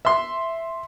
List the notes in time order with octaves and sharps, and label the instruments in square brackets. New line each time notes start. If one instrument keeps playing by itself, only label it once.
[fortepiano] E5 C6